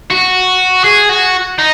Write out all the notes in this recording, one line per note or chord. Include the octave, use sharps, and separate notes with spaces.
F#4
G#4
F#4
D#4